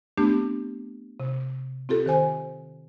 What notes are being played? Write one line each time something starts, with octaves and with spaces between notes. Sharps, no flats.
A3 B3 C4 D4 G4
C3
C4 F4 G4 A4
D#3 C5 G#5